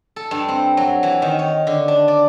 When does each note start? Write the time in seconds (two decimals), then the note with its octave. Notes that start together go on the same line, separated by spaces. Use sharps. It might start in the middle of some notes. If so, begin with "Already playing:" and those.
0.16 A4
0.31 G2
0.48 C4
0.77 F#3
1.03 E3
1.22 D#3
1.39 C#5
1.67 D3
1.88 D4
2.08 D5